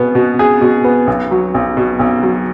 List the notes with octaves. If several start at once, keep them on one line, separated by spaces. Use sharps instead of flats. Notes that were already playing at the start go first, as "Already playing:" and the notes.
Already playing: B2 B3 G#4
B2
G#4
B2
B3
B1
F#3
B1
B2
B1
F#3